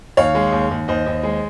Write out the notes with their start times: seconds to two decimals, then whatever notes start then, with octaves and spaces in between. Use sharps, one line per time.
0.17 D#2 C#5 F5
0.35 G#3
0.52 D#2
0.71 D#2
0.88 D#2 C5 D#5
1.06 D#2
1.23 G#3